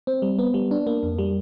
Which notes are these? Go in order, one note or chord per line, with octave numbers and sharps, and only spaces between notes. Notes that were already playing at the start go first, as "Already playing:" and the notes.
C4
G3
B3
G3
D4
A#3
F2
G3